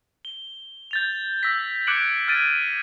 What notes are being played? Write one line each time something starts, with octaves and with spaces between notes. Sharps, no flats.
G7
G6 A6 F7
E6 A#6 B6
D6 F#6 G#6 C#7 D7 F#7
F6 G#6 A6 D7 D#7